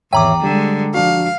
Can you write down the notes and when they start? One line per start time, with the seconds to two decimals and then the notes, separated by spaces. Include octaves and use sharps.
0.13 G#1 E2 C#5 E5 G5 A#5 D6
0.43 D3 G3 G#3
0.94 F3 D4 F#4 F5